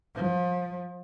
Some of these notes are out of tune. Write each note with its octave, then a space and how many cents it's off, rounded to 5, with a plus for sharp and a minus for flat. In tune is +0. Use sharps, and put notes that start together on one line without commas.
F3 +30